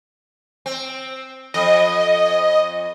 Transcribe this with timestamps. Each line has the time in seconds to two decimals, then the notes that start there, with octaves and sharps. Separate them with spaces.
0.66 C4
1.54 F2 D#5